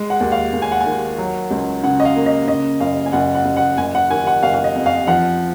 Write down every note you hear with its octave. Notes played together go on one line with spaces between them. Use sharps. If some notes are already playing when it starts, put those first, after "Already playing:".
Already playing: G#3
F#5
D#2
F5
D#2
G#5
F#5
G#5
D#3
F#3
C#2
C#3 F#5
D#5
F5
A#3
D#5
C#3 D#5
F#1 F5
G#5
F#1 F#5
F#5
F#1
F#5
F#1 G#5
F#5
D#3 G#5
F#5
F#1 F5
F5
D#5
F2
F5
F3 F#5